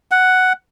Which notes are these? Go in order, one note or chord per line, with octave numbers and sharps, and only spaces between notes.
F#5